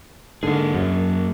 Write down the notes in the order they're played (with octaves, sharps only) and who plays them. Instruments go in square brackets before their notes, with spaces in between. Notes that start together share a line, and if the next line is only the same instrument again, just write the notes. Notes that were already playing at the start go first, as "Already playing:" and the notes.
[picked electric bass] G#2 D3 [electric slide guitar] A#3 G#4
[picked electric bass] F#2